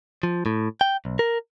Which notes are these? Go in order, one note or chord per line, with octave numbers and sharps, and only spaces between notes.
F3
A2
G5
B1
A#4